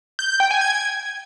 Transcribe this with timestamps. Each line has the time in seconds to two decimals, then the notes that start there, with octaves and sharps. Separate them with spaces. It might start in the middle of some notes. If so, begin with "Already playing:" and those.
0.19 G6
0.29 G6
0.40 G5
0.51 G#5
0.61 G#6